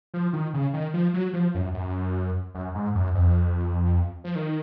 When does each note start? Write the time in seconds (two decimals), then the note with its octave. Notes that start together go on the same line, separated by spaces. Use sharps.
0.14 F3
0.33 D#3
0.54 C#3
0.74 D#3
0.94 F3
1.14 F#3
1.33 F3
1.55 F#2
1.74 F#2
2.55 F#2
2.75 G#2
2.95 F#2
3.15 F2
4.24 F3
4.35 D#3